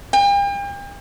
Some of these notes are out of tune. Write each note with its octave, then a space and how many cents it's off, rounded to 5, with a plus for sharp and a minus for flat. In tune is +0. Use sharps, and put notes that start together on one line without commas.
G5 +40